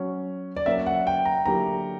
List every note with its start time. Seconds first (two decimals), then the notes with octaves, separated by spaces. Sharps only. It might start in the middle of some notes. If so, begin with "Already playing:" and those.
Already playing: F#3 C#4 F#4
0.56 D5
0.66 F#3 A#3 C#4 F#4 E5
0.86 F#5
1.07 G5
1.25 A#5
1.46 D3 F#3 A#3 E4 G4 A#5